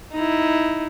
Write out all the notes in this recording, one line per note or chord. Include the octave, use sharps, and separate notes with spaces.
D#4 E4